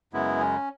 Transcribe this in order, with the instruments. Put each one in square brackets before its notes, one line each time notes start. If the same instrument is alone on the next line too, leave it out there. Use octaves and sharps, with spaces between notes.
[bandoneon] F#2 C#3 G#3 B3 E4
C#4